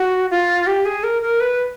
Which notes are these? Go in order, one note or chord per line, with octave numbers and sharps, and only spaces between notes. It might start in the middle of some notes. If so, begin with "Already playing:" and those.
Already playing: F#4
F4
G4
G#4
A#4
A#4
B4